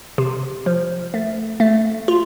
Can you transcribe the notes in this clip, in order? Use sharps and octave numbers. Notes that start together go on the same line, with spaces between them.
C3
F3
A3
A3
F4